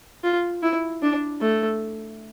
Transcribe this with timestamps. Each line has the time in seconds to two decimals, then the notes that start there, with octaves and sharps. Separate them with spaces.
0.24 F4
0.63 E4
1.02 D4
1.41 A3